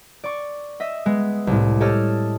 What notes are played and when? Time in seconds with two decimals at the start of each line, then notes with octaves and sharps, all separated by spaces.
0.24 D5 C#6
0.80 D#5 E5
1.06 G#3 B3
1.47 C2 A2
1.80 G4 A4 C#5 D#5 A5 F6